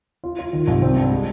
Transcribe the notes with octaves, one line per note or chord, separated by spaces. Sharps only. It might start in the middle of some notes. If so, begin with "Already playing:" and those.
F4
F4
D#3
C2
C4
G2
G#3